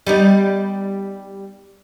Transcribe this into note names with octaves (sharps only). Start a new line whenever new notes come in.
G3 B3 D#4